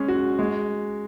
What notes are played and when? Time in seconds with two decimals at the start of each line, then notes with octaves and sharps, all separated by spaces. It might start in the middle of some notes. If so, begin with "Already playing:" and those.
Already playing: G#3 C#4
0.08 F#4
0.39 G#3